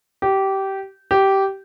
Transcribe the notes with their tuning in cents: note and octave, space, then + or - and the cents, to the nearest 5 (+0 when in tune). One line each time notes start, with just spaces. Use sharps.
G4 -20
G4 -15